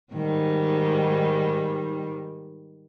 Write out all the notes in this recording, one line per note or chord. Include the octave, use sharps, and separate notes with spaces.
G#2 D#3 G3